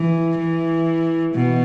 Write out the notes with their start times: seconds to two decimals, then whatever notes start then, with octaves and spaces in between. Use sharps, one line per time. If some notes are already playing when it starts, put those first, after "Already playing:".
Already playing: E3
0.38 E3
1.35 B2